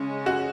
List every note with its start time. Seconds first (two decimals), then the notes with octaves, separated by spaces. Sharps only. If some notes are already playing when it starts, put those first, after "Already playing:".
Already playing: C#3 G#3 C#4
0.26 F#4